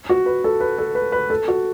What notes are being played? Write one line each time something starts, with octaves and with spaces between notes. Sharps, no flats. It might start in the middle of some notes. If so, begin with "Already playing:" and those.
F#4
B4
A4
B4
A4
B4
B4
A4
F#4